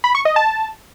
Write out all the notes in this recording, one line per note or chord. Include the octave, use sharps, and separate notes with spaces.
B5
C#6
D#5
A5